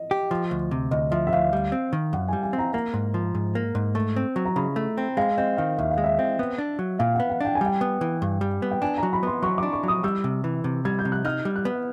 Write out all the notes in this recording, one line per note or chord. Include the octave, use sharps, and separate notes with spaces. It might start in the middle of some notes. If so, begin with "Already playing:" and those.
Already playing: D#5
G4
F3
D2
C3
D2 D#5
F3 E5
E5
D2 F5
G3
C4
D#3
F#2 F#5
G3 G#5
G#5
C4
A#5
A#3 A#5
G#2
F3
G#2
A#3
G#2
A3
C4
F#3
A#5
C#3 B5
A3
C4
G#3 F5
C4 D#5
D#3 F5
D#2 E5
F5
G#3
E5
C4
B3
D4
F#3
A#2 F5
B3 F#5
F#5
D4 G5
G#5
G3
G5
B3
E3
G2
G3
B3
G5
D4 G#5
A#5
F#3
B5
B3 C6
F#3 C#6
D4 D6
C#6
F#3 D#6
G3 E6
C3
E3
C3
G3 G#6
G6
C3
F#6
D#4 F6
G3
F#6
B3